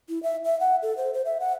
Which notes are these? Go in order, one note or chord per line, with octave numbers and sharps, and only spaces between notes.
E4
E5
E5
F#5
A4
C5
C5
E5
F#5